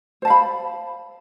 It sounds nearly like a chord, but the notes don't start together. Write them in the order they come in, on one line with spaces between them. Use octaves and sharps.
C5 A5 F5 B5